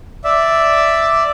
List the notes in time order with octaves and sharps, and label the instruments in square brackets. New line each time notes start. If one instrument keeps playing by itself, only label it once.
[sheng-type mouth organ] D5 E5